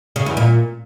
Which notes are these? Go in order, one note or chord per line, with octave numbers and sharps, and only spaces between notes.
C#3
E2
A#2